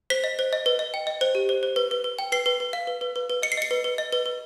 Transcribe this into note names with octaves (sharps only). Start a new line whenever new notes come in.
C5 B6
D#5
C5
D#5
B4
D#5
G5
D#5
C5
G4
C5
C5
B4
B4
B4
G5
B4 C7
B4
B4
F5
B4
B4
B4
B4
D#5 C#7
C7
D#5 C#7
B4
B4
D#5
B4
B4